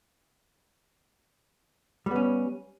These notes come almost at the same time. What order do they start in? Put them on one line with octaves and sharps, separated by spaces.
G3 B3 C#4